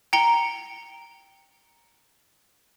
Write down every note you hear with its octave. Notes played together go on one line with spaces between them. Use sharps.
G5 A#5 C#7 G7